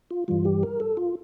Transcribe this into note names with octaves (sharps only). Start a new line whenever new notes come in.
F4
G2 E3 G3 F4
G4
A#4
A4
F4